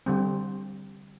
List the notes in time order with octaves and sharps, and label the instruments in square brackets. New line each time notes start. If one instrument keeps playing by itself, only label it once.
[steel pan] D3 G3 C4